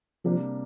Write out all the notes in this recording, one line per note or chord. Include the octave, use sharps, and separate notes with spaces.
C3 F3 G3 A#3 D4